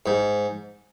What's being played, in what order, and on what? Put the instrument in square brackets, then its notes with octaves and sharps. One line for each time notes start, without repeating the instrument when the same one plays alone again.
[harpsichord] G#2